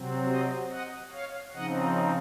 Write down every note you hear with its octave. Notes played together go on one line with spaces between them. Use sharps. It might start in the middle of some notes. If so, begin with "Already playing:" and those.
Already playing: C3 F#3 C4
C5 D#5
D#5 F#5
C#5 F5
C#3 F3 C4 D#4 D#5 F#5